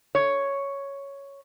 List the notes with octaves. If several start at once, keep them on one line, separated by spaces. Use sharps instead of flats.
C#5